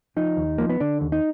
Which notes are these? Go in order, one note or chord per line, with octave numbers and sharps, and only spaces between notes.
F3 D#4
D#2
F3 A#3
B3
D3 D4
D#2
D#4